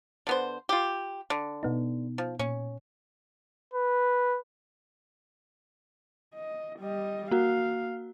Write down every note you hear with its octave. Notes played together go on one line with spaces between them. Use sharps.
D3 B3 C5
F4 G4
D3
B2 B3 D#4
F3
A#2 C#4
B4
D#5
G3 D#5
A#3 F#4 F5